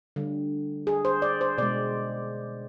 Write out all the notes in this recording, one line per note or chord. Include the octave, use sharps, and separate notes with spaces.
D3 G3
G#4
C5
D5
C5
B2 G#3 D5